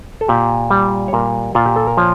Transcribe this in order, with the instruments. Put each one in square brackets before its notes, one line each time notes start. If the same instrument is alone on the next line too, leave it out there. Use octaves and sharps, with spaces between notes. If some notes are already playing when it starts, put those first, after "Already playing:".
[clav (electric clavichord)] A4
A#2 G4
G3
C#5
A#2 A#4
A#2 F4
G4
A4
A#4
F3 C#5